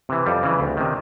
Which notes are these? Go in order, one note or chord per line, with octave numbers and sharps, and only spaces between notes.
C3 E3
F2 G3
C#3 E3
D2
C3 D#3